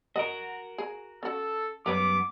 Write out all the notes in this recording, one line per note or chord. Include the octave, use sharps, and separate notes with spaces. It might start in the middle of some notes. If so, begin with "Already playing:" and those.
F#4 A#4 D#5
G#4
C#4 F#4 A4
F#2 G3 B3 A#4 B4 C#5 D6